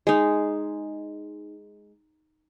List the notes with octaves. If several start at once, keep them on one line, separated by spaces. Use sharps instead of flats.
G#3 D#4